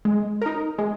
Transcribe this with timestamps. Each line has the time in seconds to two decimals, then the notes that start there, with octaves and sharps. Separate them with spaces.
0.05 G#3
0.41 D#4 A#4
0.78 G#3